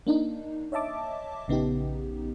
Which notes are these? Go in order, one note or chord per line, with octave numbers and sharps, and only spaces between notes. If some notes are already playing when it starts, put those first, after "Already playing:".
A#3 D4 D#4
C#5 D#5 E5 A5 D6
A#1 C#3 B3 D#4 G4